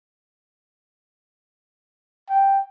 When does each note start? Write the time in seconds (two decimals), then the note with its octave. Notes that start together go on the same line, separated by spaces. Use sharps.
2.30 G5